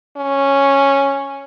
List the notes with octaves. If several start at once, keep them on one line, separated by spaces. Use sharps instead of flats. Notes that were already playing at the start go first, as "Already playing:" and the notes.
C#4